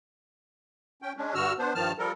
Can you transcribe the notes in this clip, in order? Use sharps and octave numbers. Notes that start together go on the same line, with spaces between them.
C#4 G5
G#3 C#4 D4
G2 D3 F#4 E6 F6
B3 D4 C5
G2 D#3 F3 A5 F6
F3 G3 A4 A#4